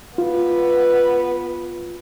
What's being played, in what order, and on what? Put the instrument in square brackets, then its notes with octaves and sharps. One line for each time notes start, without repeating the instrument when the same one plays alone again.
[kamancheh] B3 B4 [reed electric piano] F4